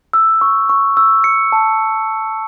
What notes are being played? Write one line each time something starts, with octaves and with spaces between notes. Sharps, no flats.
E6
C#6
C#6
E6
C#7
A5